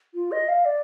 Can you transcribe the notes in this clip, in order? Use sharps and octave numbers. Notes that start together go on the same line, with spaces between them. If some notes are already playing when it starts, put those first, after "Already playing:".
F4
D#5
F5
D5